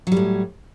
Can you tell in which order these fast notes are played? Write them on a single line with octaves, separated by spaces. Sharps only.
F#3 G3 A2